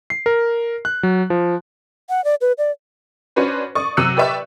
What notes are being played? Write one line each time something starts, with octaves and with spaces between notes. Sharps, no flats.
C7
A#4
F#6
F#3
F3
F#5
D5
B4
D5
C#4 D4 F#4 B4 C5
D5 C#6 D#6
C3 F#3 E6 F#6 C#7
G4 B4 D5 E5 C#6 E6